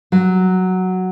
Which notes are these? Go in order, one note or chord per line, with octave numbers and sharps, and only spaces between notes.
F#3